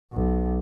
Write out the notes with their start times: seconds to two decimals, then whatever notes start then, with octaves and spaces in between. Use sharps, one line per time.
0.13 B1